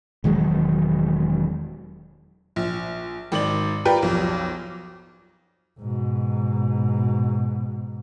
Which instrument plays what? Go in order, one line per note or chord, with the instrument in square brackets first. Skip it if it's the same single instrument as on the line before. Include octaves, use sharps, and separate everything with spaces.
[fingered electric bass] E1 D#3 F#3 G#3
[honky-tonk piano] A#1
G#1 D#3 D5 F#7
F4 G4 A#4 B4 D5 G5
B1 F2
[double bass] G#2 B2